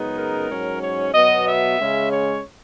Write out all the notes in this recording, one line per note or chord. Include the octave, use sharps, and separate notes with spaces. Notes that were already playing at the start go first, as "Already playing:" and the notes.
Already playing: F#2 C#3 G#3 B3 D#4
A#4
G#2 F#3 C#4
C#5
B2 F#3 B3 D#5
E5
C#3 G#3 C#4
C#5